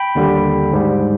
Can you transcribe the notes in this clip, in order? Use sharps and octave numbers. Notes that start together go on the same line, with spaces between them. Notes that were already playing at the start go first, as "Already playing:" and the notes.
Already playing: G5 B5
D#2 D3 G3
G#2 G3